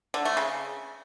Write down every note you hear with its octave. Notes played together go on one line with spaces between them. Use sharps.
D3
A3
C#3